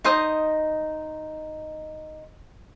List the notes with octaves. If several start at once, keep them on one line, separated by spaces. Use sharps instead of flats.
D#4 C5 D#5 D#6